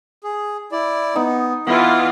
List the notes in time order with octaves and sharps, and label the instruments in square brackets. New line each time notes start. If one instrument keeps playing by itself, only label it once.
[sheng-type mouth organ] G#4
E4 D5
[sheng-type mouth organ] B3 [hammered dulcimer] D#4
[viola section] E3 F4 [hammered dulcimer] B3 [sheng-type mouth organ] E4